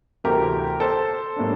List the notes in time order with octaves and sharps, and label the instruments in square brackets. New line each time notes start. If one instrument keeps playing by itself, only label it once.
[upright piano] D2 C3 E3 A3 C4 G4 A#4
A4 C5
A2 G3 A#3 D4